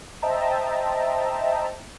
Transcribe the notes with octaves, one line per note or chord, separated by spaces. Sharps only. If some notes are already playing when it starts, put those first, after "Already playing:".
C5 D#5 E5 G5 A5 A#5